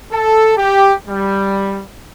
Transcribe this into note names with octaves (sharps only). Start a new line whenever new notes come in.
A4
G4
G3